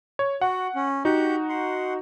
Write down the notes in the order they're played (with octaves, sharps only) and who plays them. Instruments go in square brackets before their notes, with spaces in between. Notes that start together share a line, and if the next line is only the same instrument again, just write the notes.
[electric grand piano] C#5
[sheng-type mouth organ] F#4 [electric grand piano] F#5
[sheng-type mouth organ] C#4
[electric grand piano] D#4 F#4 [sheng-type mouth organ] G4 F#5 G6
[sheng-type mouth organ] F#5 C6